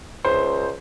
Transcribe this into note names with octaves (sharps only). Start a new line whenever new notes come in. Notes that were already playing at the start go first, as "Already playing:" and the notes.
C#2 C5